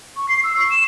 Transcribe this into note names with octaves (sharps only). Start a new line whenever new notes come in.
C#6
C7
E6
C#6
E7